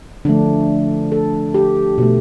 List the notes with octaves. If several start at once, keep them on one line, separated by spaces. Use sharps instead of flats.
D3 F3 A3 D4
A4
G4
B2 A3